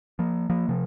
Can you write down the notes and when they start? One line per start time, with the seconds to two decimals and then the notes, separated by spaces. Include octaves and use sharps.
0.19 F3 A#3
0.50 F3 A#3
0.69 C3 F3